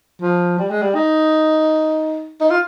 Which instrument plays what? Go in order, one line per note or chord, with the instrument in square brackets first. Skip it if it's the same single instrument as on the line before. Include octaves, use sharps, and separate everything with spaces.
[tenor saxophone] F3
G3
G#3
G3
D#4
D#4
F4